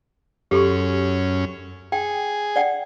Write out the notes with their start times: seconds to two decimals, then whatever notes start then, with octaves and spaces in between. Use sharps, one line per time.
0.51 F#2 C#4 G4 A4 C6
1.92 G#4 G5
2.56 D5 F#5 G5